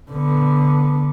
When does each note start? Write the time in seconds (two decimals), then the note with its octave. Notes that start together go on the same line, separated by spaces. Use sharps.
0.11 D3 B3